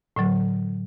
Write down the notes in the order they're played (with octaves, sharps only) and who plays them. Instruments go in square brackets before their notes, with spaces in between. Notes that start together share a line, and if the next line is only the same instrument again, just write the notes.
[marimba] A2 D3 F#3